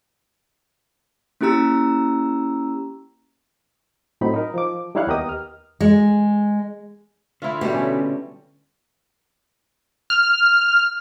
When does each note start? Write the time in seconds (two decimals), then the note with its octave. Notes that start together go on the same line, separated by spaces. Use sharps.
1.41 A#3 C#4 E4 G4 A#5 E6
4.21 A2 F#3 C4 D#4 B5
4.34 D#4 A#4
4.54 F3 D6
4.95 G3 D#4 E4 C#5 F5 F#6
5.07 D#2 B3 G4 A#4 D#5 D#6
5.29 F6
5.80 G#3
7.42 D3 E4 F4 E5
7.61 B2 G3 A3 G4
7.74 C#4
10.10 F6